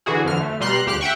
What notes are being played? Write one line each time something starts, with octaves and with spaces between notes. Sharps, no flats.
D3 E3 F#4 G#4
F2 D3 F6
A3
B2 G3 A#5 C6 F6 F#6
D2 G4 F6 F#6
E5 F#5 G5 C#6